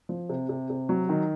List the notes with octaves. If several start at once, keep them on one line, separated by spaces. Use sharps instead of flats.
F3
C3
C3
C3
F#3
D#3